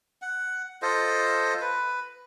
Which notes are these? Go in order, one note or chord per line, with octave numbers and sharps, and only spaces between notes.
F#5
F4 A4 C5 D#5
B4